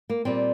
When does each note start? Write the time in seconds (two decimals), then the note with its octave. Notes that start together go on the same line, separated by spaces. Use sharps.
0.10 A#3
0.25 A#2 G3 C4